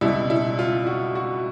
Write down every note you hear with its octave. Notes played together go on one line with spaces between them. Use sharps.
C#2 B2 G3 E4
E4
F4
F#4
F#4